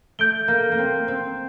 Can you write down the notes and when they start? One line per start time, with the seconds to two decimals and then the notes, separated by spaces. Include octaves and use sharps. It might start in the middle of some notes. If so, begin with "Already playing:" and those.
0.19 A3 G6 D7 G7
0.48 A#3
0.72 A#3
0.78 C4
1.08 C4